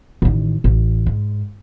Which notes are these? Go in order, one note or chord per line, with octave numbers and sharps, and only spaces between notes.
A1 D#3
A1
G#2